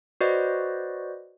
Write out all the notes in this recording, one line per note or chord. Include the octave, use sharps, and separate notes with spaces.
F#4 B4 C5 D5 D#5